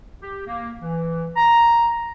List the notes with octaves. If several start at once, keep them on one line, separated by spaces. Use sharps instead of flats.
G4
A#3
E3
A#5